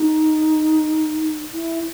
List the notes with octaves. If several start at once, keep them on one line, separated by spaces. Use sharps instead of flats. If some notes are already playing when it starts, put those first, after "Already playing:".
Already playing: D#4
E4